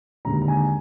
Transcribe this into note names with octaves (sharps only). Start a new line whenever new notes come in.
D#2 D3 G#3 A#5
A#5
G#5